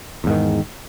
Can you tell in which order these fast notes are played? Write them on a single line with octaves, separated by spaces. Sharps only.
E2 G#2 D#3